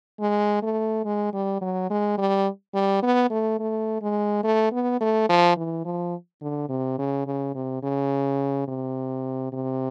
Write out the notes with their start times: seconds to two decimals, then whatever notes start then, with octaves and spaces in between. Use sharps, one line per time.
0.20 G#3
0.62 A3
1.05 G#3
1.34 G3
1.61 F#3
1.90 G#3
2.18 G3
2.74 G3
3.02 B3
3.30 A3
3.59 A3
4.02 G#3
4.44 A3
4.72 B3
5.01 A3
5.29 F3
5.57 E3
5.85 F3
6.42 D3
6.69 C3
6.98 C#3
7.27 C#3
7.55 C3
7.83 C#3
8.68 C3
9.52 C3